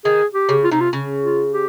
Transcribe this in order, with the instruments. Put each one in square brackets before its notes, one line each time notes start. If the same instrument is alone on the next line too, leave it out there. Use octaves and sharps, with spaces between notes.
[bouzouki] D#3 [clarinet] G#4
[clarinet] G4
[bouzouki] C#3
[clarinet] F4
[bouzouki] C3 [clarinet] D#4
[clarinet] F4
[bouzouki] C#3
[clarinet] F4
G4